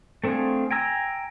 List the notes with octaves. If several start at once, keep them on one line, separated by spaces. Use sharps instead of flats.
A3 C4 D4 F4 G#4
G5 G#5 A#5 E6